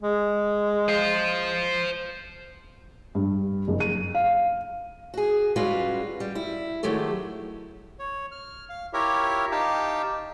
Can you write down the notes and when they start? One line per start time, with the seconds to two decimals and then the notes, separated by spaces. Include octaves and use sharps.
0.02 G#3
0.89 C5 F5
3.15 G2
3.68 F#1
3.80 D#7
4.15 F5
5.14 F#4 G#4
5.56 G3 G#3 C#4 F4 F#4 B4
6.20 G3
6.35 E4
6.83 D#3 F#3 G#3 A3 G4 A4
7.99 C#5
8.32 F6
8.69 F5
8.93 E4 F4 G4 A#4 C#5 E5
9.52 D#4 G4 F5 G5 A5